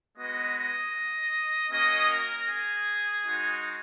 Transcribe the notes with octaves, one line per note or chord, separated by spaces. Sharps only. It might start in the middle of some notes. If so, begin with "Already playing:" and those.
G#3 B3 F#4 D#5
D#5
A#3 C#4 F#4 D#5
A#4
G#4
G#3 D#4 F#4